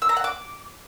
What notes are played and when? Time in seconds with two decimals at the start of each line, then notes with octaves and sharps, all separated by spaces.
0.02 E6
0.09 A#5
0.17 F#5
0.24 D6